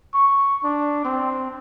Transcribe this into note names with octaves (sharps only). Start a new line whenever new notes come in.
C#6
D4
C4